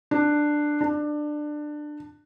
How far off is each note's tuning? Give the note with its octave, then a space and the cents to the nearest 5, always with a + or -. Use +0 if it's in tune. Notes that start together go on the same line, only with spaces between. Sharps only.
D4 +10
D4 +20